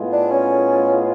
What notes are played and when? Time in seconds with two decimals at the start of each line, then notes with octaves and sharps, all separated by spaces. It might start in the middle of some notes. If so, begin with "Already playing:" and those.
Already playing: A2 G#3 B3 F4
0.13 D4
0.31 C#4